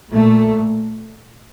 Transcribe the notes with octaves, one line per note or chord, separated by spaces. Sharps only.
A#2 A3